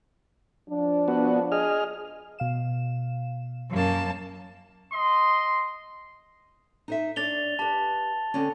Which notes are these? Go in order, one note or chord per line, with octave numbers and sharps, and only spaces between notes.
F3 D4
B3 F#4
G#4 D#5 F6
B2 F5 E7
F#2 A#3 A5
D#5 C6
D#4 C5 E5
D4 C#5 D5 A6 F7 G7
G4 B4 A5
D3 C4 C#4